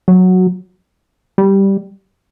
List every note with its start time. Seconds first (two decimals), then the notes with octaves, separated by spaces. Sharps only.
0.08 F#3
1.38 G3